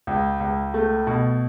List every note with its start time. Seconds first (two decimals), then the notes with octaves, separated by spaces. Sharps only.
0.07 C#2
0.40 C#2
0.74 A3
1.07 B2